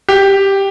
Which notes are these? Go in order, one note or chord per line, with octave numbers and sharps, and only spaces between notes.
G4